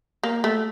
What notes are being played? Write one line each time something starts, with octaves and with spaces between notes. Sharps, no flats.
A#3
A3